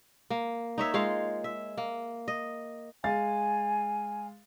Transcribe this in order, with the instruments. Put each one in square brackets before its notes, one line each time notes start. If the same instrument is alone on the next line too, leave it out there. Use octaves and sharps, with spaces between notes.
[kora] A#3
D#4 C#5 E5
G#3 F4 C#5 F5
E5
A#3
D#5
[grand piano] G#3 F5 A6 [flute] G#5